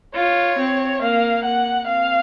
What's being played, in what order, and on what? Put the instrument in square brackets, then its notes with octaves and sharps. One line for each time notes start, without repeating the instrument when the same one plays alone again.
[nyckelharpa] F4 [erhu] C#5
[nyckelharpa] C4
[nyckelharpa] A#3 [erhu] F5
[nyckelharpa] A#3 [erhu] F#5
[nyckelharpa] C4 [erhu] F5